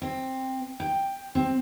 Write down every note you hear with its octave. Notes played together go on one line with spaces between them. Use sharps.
C4
G5
C4